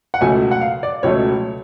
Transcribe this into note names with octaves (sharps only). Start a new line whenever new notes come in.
F#5
C#2 B2 F#3 A3 G#5
F#5
F5
D5
C#2 B2 F#3 A3 C#5